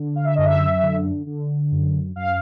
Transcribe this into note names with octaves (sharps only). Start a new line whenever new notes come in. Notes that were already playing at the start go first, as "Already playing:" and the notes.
Already playing: D3
F5
E5
F#2 D#5
E5
D3
D3
F#2
F#2 F5